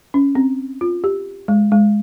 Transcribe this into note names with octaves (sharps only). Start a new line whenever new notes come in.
C#4
C4
F4
G4
G#3
G#3